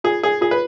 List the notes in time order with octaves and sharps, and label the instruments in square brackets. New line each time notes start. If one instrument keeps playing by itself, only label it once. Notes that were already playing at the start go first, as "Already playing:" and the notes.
[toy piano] F4 [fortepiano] G#4
[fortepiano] G#4
[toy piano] F4 [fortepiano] G#4
[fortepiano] B4